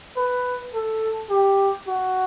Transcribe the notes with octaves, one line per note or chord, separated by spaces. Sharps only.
B4
A4
G4
F#4